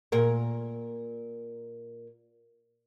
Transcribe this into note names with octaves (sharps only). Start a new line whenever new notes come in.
A#2 A#4